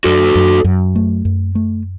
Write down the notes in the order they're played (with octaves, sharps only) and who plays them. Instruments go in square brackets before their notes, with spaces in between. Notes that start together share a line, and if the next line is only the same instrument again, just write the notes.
[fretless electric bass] F#2 [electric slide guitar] F#4 A4
[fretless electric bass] F#2
F#2
A3
F#2
A3